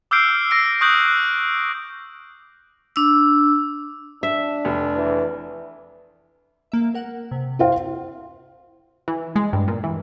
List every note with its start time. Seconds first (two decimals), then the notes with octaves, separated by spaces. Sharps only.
0.11 D6 E6 F6 G6 C7 D7
0.51 E6 A#6 C7 D7
0.81 C#6 D#6 F#6 G6 D7 F#7
1.08 F#6
2.96 D4 E6
4.23 D4 E5
4.65 F1
4.96 E3
6.72 A#3 E5
6.94 A#4 F#5
7.31 C3
7.59 E4 C5 F5
9.08 E3
9.36 G#3
9.53 G2
9.68 A#2
9.84 E3